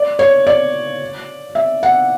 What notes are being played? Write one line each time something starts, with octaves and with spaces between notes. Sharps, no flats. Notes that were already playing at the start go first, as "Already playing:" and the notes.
Already playing: D5
C#5
D5
E5
F#5